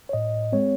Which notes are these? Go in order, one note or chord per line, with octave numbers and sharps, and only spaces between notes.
C#5
A2 D#5
G#3 C4 C#5